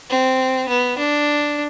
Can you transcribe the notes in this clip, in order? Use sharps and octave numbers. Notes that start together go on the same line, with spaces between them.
C4
B3
D4